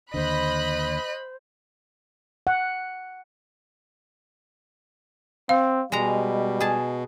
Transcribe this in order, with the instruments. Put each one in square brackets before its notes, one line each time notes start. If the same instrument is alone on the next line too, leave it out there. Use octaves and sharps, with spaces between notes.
[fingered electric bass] D#2 D3 [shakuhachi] C5 [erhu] D#5 [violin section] B5 F#6
[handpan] F#5
[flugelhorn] C4 [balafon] F5
[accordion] B2 [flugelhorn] G3 [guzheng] G#3 A#5
[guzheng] G#4 A5